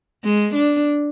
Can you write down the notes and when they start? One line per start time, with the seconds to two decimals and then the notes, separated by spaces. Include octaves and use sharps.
0.24 G#3
0.54 D4